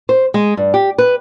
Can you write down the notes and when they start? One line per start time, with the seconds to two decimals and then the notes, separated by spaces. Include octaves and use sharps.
0.09 C5
0.34 G#3
0.57 G2
0.74 G4
0.98 B4